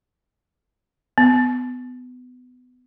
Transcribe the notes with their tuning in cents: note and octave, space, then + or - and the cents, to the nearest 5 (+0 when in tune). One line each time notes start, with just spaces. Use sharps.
B3 +20